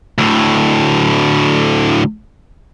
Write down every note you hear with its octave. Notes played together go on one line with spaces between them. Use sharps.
D2 A2